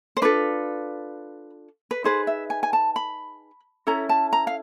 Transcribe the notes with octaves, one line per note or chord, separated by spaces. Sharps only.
C5
D4 F4 A4 B4
B4
D#4 G#4 B4 C5
E5
G#5
G#5
A5
B5
C#4 E4 A4 A#5
A5
A#5
F5